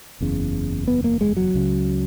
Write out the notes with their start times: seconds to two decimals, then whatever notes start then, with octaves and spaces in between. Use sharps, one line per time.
0.21 F#1 E2 C#3
0.88 B3
1.04 A#3
1.21 G#3
1.37 F#3
1.54 C#2 C#3